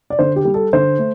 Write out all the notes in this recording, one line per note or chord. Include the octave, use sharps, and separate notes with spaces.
D5
D3 C5
G4
G3
A4
D3 C5
A3